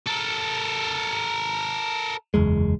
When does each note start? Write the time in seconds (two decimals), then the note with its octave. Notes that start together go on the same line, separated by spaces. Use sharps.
0.07 A4 A#4
2.34 F#1 E2 G#3